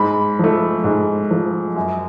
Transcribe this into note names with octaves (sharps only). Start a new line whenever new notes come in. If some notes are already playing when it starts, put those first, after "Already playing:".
Already playing: G#2 B5
F3 A3
G#2
F3 A3
F#2